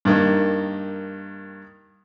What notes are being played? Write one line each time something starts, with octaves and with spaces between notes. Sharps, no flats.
G2 D#3 A#3